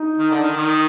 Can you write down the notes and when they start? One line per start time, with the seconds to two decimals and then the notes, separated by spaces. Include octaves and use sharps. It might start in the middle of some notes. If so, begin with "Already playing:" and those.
Already playing: D#4
0.18 D#3
0.31 D3
0.43 D#3
0.57 D#3 D#4